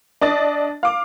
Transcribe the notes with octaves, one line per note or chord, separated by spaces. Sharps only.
D4 D#5 A6
F5 D6